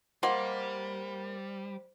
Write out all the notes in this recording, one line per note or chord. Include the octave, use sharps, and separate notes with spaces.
G3 A#3 C5 D#5 F#5 C6